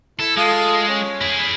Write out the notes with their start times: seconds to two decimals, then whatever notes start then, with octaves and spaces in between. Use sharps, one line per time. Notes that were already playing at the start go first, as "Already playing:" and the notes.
0.20 E4 A4
0.37 G#3 F4 A4 D#6
0.88 C#4
1.21 E4 G#4